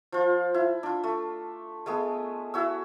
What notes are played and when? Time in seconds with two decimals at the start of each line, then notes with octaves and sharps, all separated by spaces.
0.12 F3 F4
0.54 E4
0.83 D4 F4
1.04 A3
1.86 G#3 A3 B3 G#4
2.54 E4 F#4 E6